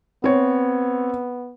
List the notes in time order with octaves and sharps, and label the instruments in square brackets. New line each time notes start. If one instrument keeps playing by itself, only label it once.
[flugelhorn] B3 [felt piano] C4 C#5